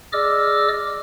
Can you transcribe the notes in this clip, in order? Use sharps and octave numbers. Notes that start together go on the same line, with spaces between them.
G#4 D5 D#5 D6 E6 F6